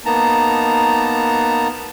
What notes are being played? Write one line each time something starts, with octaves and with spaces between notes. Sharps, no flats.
A#3 B3 D#4 A5 A#5